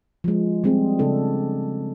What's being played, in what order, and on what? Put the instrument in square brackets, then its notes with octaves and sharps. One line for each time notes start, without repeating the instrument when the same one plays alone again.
[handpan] F3 G#3
G3 G#3 C4 D4 G#4
C#3 D4 A4